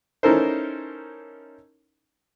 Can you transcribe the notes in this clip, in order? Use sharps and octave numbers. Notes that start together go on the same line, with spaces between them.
C#4 D#4 E4 A4 A#4 C5